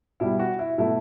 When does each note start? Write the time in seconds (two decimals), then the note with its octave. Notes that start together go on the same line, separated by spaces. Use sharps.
0.20 B2 G3 E4
0.39 F#4
0.59 E4
0.78 B2 F#3 A3 E4